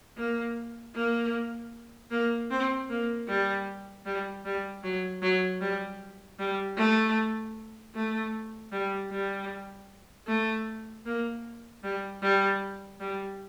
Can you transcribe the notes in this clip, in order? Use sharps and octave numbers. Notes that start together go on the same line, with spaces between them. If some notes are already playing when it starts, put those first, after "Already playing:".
A#3
A#3
A#3
C4
A#3
G3
G3
G3
F#3
F#3
G3
G3
A3
A3
G3
G3
A3
A#3
G3
G3
G3